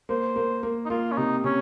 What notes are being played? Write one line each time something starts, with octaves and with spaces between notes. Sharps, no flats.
A#3 C5
A#3
A#3
D#4
A#3 F4
C#4
C3 D#4
C3 C#4